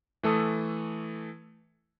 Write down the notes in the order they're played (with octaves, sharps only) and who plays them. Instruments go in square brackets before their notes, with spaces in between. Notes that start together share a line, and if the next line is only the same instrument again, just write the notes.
[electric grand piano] E3 A3 A4 D#6